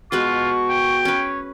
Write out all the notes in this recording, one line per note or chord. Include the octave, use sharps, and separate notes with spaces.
B2 G#3 F4 B4 C#6
G5
C#4 B4 C#5